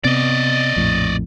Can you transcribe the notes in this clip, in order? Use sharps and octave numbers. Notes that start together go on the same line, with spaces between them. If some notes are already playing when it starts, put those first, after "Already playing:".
C3 B3 D5 D#5
A#1 F2 A2